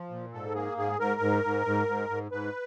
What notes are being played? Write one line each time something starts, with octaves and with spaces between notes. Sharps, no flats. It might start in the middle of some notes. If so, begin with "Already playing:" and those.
Already playing: F3
A#2
G#2 A4
A#3 G#4
G#2 G#4
G#2 A#4
G#2
G#2
G#2
G#2
G#2
G#2 B4